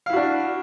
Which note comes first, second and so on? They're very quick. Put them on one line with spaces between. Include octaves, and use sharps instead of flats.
F5 E4 F#4 D4